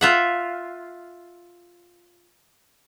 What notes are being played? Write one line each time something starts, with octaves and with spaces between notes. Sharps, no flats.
F4 E5 F#5